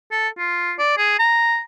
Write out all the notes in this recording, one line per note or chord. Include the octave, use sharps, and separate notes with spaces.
A4
F4
D5
G#4
A#5